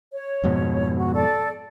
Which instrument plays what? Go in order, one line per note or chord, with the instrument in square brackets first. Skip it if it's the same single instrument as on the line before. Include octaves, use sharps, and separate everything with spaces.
[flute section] C#5
[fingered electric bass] F2 G#2 B2
[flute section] F#4
A4 D5